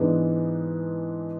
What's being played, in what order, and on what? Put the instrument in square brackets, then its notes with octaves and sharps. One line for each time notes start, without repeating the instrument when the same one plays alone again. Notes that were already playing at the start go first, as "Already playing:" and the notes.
Already playing: [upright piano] G#2 E3 G#3 B3 D4